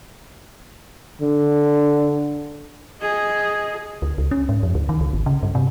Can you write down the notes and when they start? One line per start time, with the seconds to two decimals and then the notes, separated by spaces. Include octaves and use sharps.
1.22 D3
3.01 G#4 D#5
4.02 D2
4.18 C#2
4.31 C#4
4.49 G#2
4.63 F2
4.75 D2
4.89 D#3
5.01 C#2
5.13 G#1
5.26 C#3
5.43 G2
5.55 C3